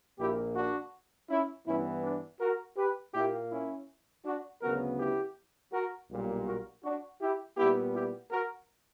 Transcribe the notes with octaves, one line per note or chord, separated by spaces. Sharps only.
A#1 A#2 A#3 E4 G4
D4 F#4
C#4 E4
G2 E3 B3 C#4 E4
D4
F#4 A#4
G4 B4
A#2 A#3 E4 G4
C#4 E4
D4 F#4
D2 C#3 F#3 B3 F#4 A#4
E4 G4
F#4 A#4
B1 A#2 G3 A#3
F#4 A#4
D4 F#4
E4 G4
A#2 G3 B3 E4 G4
E4 G4
F#4 A#4